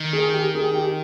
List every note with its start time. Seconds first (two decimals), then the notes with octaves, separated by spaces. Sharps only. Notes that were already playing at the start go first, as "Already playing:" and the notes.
Already playing: D#3
0.13 G#4
0.33 G4
0.55 G#4
0.75 G4